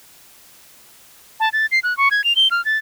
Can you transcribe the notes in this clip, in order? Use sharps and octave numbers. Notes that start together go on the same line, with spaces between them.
A5
A6
C7
F#6
C#6
G#6
F7
G7
F6
A6